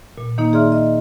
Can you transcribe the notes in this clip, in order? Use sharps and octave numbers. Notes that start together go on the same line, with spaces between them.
A#2
D#3 A#3 D#4
G#4 D5 E5 C6 F6
D#5